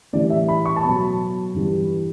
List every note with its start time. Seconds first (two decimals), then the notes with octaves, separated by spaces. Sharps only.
0.13 A2 E3 G3 D5
0.30 E5
0.48 B5
0.66 C#6
0.76 A5
0.83 B2 F#3 B5
1.53 G2 E3 G3